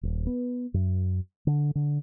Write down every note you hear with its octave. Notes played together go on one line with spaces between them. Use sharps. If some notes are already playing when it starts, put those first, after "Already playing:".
D#1
B3
F#2
D3
D3